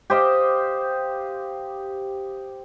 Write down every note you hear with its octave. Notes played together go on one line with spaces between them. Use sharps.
G4 C5 D#5 F5